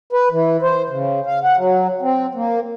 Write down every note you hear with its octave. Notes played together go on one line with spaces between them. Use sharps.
B4
E3
C5
C#3
F5
F#5
F#3
C4
A#3